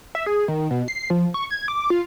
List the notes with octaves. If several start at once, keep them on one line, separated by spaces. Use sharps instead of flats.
E5
G#4
D#3
B2
C7
F3
C#6
G#6
D6
F4